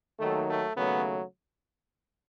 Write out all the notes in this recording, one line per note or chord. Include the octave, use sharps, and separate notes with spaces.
D#2 D#3 F#3 A3
A3
D#2 C#3 F#3 A3 B3